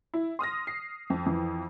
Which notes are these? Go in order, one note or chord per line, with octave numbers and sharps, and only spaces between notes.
E4
C6 D#6 F6 A#6
C7
F2
F2 E3